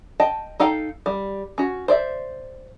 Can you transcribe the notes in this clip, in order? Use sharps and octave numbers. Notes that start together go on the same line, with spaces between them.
D#5 G5 A5
D#4 A4 F5 G5
G3
C#4 F#4
C5 D5 E5